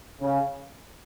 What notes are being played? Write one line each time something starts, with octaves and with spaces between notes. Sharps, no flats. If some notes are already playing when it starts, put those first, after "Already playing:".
C#3